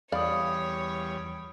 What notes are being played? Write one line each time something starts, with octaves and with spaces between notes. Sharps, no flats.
E2 G3 C#5 D5 F5 B5 D#6